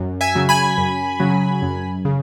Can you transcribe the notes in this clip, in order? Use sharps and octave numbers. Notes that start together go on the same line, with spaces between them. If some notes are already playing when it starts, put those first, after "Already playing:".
Already playing: F#2
E5 G#5
C#3 F#3
G#5 B5
F#2
C#3 F#3
F#2
C#3